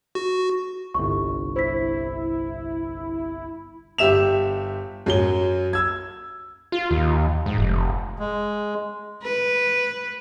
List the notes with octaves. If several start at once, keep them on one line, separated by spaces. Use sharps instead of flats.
F#4
G1 C2 C#6
E4 C5 B6
G1 G4 E5 E7 F7
F#2 F#3 G7
E6 G#6
F4
D#2
G#2
F1
G#3
B4